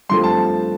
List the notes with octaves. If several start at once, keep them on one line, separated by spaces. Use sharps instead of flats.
G2 F3 A3 C4 C6
A5